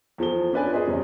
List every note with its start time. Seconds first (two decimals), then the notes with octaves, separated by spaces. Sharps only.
0.18 E2 F3 A4 G7
0.53 C#4 D4 F4 B4 D5 G#5
0.73 G#4 B4 C5 D5 D#5
0.87 F1 E2 G3 C#4